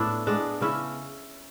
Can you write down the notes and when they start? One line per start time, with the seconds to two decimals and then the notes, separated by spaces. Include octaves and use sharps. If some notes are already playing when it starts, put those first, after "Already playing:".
Already playing: A2 B3 D4 E4
0.27 G#3 B3 D4
0.61 C#3 C#4 E4